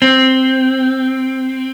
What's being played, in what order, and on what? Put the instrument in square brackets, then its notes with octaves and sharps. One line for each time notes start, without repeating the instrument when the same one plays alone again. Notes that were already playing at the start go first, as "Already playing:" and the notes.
[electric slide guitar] C4